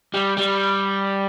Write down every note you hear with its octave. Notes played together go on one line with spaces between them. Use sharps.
G3
G3